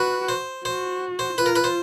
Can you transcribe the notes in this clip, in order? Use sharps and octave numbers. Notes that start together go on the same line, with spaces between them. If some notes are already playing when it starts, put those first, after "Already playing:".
Already playing: F#4 B4
C5
F#4 C5
C5
F4 B4
A#4
B4
C5